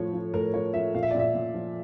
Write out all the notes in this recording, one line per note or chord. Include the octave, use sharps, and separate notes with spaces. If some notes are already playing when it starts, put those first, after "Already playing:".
Already playing: A2 F3 C#5
F3
A2 A#4
F3 C#5
F3 E5
A#2 F5
E5
D5
A#2 E5
A#2
F3